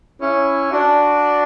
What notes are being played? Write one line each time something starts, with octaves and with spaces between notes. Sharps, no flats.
C#4 E4
D4 F#4